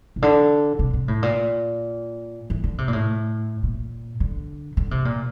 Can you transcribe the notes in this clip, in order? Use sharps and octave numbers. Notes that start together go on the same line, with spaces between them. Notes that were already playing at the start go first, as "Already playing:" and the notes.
C3
D3
C3
C3
A2
A#2
E3
D3
C3
A#2
A2
A#2
D3
D3
C3
A#2